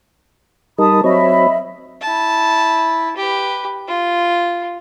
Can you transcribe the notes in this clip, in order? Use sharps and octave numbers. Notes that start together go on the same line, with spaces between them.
G3 D#4 A#4 A5 B5 D#6
F#3 C4 C#5 D#5 E5 B5
E4 A5
G4 B4
F4